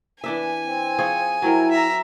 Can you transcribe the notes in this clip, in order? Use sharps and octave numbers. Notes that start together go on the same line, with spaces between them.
E3 B3 D4 E5 G#5
C4
F3 G#4 C#5
F#3 C4 E4 A#4
E5 A#5